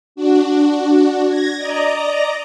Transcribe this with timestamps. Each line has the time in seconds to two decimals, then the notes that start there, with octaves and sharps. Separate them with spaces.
0.16 D4 F#4
1.28 G#6 A#6
1.57 D5 D#5 A#5